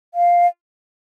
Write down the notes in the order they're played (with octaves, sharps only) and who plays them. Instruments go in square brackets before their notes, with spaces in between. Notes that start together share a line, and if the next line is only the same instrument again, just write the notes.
[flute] F5